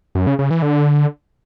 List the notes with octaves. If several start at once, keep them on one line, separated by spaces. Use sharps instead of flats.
F#2
C#3
C#3
E3
D3